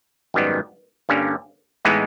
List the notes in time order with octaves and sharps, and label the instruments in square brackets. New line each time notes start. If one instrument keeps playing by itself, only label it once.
[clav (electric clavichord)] G#1 F#2 D#3 G3 B3
G2 D3 G3 A#3 C#4
A2 E3 G#3 B3 D#4